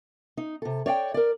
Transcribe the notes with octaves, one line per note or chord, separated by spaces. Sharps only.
D#4
C3 A4
C#5 D5 F5 G5
A#4 D5